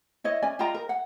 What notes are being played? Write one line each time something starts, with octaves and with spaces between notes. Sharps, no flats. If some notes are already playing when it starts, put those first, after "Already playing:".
E4 C#5 D#5
C#4 D5 G#5
F4 D#5 G5 A#5
A#4
F#5